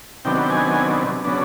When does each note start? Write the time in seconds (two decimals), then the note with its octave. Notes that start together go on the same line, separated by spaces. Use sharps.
0.25 C3 D#3 F#3 B3 D4 G5
0.43 G5
0.50 G#5
1.24 C#3 F#3 B3 D4